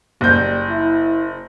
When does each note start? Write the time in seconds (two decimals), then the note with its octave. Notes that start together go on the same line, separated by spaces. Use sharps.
0.21 F#1 G3 G6
0.69 E4